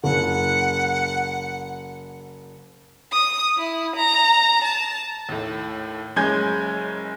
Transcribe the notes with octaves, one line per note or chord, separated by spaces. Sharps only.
F#1 F#5
D#6
E4
A#5
A5
D#2 A2
F#1 G#3 C#4 G#5 G6 G#6